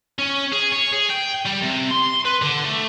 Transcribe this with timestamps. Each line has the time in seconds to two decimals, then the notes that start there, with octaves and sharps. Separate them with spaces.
0.19 C#4
0.52 G#4
0.72 C#5
0.93 G#4
1.10 G5
1.46 G3
1.63 C3
1.91 C6
2.25 B4
2.42 D3
2.64 A3